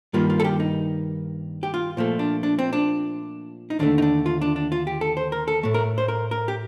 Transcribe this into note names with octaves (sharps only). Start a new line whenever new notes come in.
G2 D#3 G3 A#3 F4
F4
A4
G4
D#4
G4
F4
A#2 F3 A3
D4
D4
C4
D4
D#4
D#2 D3 A3 D4
D#4
D4
F4
D4
D4
F4
G4
A4
C5
A#4
A4
A2 A3
A#4
C5
A#4
A#4
G4